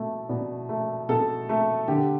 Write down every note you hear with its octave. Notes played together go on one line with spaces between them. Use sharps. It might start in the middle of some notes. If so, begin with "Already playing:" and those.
Already playing: B2 A3
B2 D5
A3
B2 A4
A3
D3 G4